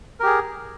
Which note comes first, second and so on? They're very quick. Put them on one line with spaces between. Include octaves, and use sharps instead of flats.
A#4 G4 G#4